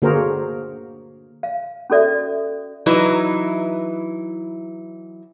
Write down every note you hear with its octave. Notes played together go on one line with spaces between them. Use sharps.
D3 A#3 F#4 G#4 A#4 C5
F5
C#4 F#4 A4 D5 E5
E3 F#3 D#4 E4 B4